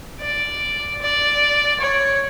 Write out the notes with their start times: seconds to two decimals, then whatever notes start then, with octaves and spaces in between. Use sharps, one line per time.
0.20 D5
1.01 D5
1.80 C#5